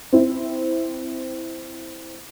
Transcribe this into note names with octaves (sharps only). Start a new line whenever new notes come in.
C4 E4